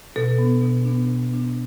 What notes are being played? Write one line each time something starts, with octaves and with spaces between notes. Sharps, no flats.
B2 A4
B3 D4
B2
B3 D4
B2
B3 D4